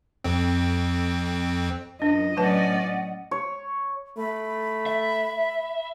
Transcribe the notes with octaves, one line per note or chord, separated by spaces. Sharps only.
F2 C4
F#2 D4 D#5
A2 F#3 C#4 B4 D5 F#5 A5
C#5
A3 B5
E5